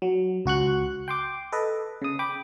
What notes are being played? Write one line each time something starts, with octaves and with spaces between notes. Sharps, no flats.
F#3
C#2 F#4 C#6 F#6
G5 C6 D6
A4 B4 D#5
C#3 D#6
G5 B5 D6